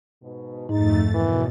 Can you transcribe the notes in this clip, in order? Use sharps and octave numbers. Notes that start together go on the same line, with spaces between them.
G#2 B2
F2 G#2 A3 D#4 A6
F#2 B2 D#3 E3